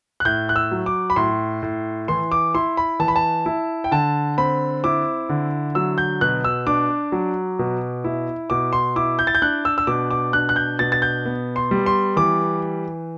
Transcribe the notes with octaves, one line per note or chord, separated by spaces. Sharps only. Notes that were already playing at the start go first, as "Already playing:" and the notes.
F#6
A2 G6
F#6
E6
F#3
D6
B5
A2 C6
A2
E3 C6
D6
E4 C6
B5
E3 A5
B5
A5
E4
G5
D3 A5
C4 B5
E4 D6
D3
F#3 E6
G6
B2 F#6
E6
D4 D6
F#3
B2
E4
B2 D6
C6
E4 D6
G6
A6
G6
D4 F#6
E6
E6
B2 D6
D6
D4 F#6
F#6
G6
B2 A6
A6
G6
B3
C6
G3
C6
E3 D6